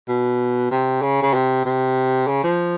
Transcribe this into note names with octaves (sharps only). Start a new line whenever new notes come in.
B2
C3
C#3
C#3
C3
C3
C#3
F3